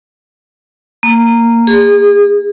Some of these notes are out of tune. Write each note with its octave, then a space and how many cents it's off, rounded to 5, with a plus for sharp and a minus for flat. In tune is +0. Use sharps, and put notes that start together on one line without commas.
A#3 -10
G#4 -35